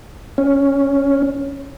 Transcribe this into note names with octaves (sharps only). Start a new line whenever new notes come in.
C#4